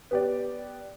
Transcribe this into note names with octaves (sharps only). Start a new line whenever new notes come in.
B3 G4 D5